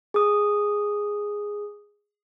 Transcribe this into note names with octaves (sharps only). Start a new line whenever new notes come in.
G#4 D#6